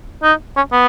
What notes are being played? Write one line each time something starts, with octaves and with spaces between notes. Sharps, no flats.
D#4
C#4
B3